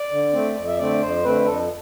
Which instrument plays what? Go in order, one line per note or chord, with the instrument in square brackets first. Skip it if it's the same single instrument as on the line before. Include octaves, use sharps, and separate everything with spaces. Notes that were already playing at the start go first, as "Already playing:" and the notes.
Already playing: [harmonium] D5
D3
A3 C4
F2
E5
D3 A3 C4 D5
F2 C5
D3 A3 C4 B4
F2 A4